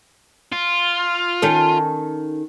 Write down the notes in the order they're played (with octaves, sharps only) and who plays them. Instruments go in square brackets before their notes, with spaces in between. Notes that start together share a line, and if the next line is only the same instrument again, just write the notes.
[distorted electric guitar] F4
[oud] D#3 C#4 A4